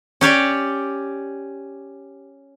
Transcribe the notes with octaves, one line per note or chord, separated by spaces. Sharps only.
C#4 G4 C#5 D5